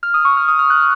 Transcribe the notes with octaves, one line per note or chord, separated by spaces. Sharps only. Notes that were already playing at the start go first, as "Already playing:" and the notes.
F6
D#6
C#6
F6
D#6
F6
F#6